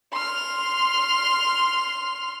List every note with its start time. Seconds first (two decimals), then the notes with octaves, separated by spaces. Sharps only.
0.13 C6 F6